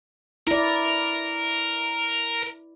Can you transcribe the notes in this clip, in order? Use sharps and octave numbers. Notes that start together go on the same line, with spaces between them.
E4 A#4 D5